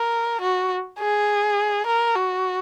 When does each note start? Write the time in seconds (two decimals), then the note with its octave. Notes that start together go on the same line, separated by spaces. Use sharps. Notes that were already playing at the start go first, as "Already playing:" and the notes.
Already playing: A#4
0.41 F#4
1.00 G#4
1.86 A#4
2.16 F#4